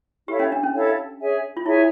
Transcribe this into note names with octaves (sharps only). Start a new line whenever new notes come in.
E4 G4 A4 C#5 F5
C#4
D4
C#4
E4 A4 C#5 F5
G#4 C#5 E5 G#5
F4
E4 G#4 C#5 E5 G#5